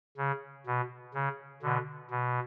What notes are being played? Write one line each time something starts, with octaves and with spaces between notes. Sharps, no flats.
C#3
B2
C#3
B2 D3
B2